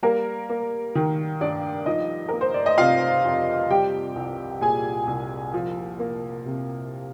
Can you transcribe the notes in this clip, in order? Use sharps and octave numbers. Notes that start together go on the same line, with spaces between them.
G3 A#3 A#4
A#3
D#3
G2 D4 D5
F3 D#4 D#5
A#3 A#4
C5
D5
D#5
C3 F4 F5
F2
G3 G4 G5
C2
A#2 G#4 G#5
C2
F3
A#3
C3